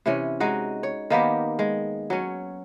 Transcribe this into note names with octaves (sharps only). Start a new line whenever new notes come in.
C3 E3 C#4
G#3 D#4 F#4
C#5
D#3 A#3 B3 G4
G#3
F#3 C#4